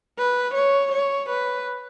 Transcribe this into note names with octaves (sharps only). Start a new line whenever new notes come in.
B4
C#5
C#5
B4